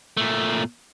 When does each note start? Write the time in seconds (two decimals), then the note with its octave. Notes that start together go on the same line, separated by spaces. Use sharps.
0.17 A#2 A3